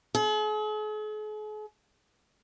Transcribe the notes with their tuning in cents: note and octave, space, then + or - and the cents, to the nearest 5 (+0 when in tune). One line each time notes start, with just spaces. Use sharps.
G#4 +45